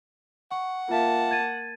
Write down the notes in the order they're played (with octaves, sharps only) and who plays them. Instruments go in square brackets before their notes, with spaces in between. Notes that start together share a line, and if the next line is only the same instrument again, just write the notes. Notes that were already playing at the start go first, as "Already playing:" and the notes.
[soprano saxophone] F#5 [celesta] C#6
[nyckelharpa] A#3 A5 [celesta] F4 E5 F5
[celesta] G#6 A6 D#7